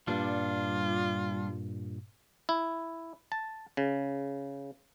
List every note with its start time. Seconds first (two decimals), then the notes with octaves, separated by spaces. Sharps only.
0.07 G2 A#2 G3 D4 F4
2.49 E4
3.32 A5
3.77 C#3